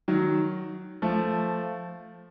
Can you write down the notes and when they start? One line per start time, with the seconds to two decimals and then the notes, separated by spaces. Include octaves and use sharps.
0.08 D#3 F#3
1.02 F3 A3